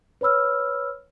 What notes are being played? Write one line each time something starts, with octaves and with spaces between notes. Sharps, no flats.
B4 C#5 B5 E6 F6